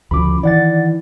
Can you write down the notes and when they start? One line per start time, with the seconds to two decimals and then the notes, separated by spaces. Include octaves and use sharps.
0.11 D2 C#3 F3 B5 D6
0.43 D#3 E3 D5 F#5 A6